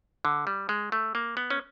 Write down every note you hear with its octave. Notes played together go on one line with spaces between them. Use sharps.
D3
G3
G#3
A3
A#3
B3
C#4